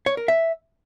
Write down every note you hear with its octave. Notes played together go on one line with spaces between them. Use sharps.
C#5
A#4
E5